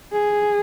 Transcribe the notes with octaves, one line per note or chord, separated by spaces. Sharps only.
G#4